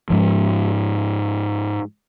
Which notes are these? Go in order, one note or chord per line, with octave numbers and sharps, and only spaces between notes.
G#2 F3